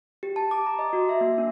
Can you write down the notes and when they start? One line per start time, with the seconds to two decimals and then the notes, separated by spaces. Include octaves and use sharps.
0.23 G4
0.36 A5
0.51 D6
0.67 A#5
0.79 D#5
0.93 F#4
1.09 E5
1.21 A#3
1.38 D4